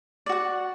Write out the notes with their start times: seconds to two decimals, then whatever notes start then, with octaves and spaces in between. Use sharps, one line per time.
0.26 D5
0.29 F#4
0.32 F#5